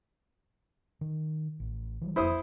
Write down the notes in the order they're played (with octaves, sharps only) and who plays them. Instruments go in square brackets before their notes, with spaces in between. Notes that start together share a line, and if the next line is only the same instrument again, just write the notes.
[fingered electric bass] D#3
A1
E3 F#3 G3
[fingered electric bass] F#1 F2 [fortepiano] E4 C5 D#6